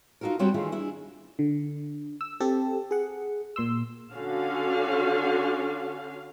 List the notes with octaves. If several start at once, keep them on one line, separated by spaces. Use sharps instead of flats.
D#4 F4 F#4 A4 A#4
G3 C4 F#4 C#5 G5
D#3 E3 A3 E4 F4 G#4
D4 E4 G#4
D3
E6
C4 G4 A4
G#4 F#5
A#2 C6 E6
D3 C#4 F#4 F5